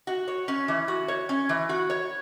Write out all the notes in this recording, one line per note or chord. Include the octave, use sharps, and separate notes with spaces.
F#4
C#5
C#4
E3
F#4
C#5
C#4
E3
F#4
C#5